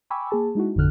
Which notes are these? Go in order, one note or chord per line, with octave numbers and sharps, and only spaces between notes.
G5 G#5 B5 C#6 D6 E6
A#3 G#4 A5
G#3 D#4 E4 F#4
A1 F2 G#2 D3 F6 F#6